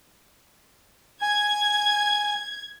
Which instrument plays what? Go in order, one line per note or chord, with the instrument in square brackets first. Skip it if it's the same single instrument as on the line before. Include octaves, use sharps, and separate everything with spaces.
[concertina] G#5 [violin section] G#6